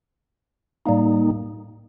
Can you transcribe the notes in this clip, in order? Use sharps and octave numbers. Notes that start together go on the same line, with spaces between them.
A2 G3 A#3 D#4